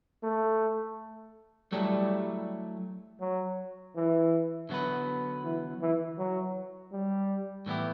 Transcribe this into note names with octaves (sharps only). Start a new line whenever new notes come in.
A3
F#3 G3 A3 E4 A4 C#5
F#3
E3
D3 F#3 B3 F#4 B4
E3
E3
F#3
G3
A2 E3 B3 E4 G4